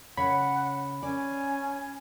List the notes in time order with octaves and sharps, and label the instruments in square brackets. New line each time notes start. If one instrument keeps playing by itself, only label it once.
[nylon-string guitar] C#3 C#5 [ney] F#5 [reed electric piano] B5
[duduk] C#4 [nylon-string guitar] D5 [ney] G#5